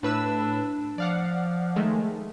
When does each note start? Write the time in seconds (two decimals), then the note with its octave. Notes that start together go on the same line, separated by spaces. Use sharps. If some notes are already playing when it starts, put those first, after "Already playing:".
0.03 A2 D4 B4 E6
0.98 F3 D5 F5 F#5
1.76 D#3 G#3 A3